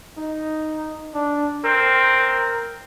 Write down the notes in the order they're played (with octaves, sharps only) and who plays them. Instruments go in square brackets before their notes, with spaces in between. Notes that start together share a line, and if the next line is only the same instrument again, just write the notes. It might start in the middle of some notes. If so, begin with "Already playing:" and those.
[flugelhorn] D#4
D4
[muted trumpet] C4 [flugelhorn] A#4